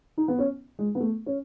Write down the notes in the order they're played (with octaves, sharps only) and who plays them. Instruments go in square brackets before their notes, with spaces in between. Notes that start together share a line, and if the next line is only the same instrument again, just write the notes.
[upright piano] D#4
B3
C#4
G#3
B3
A3
C#4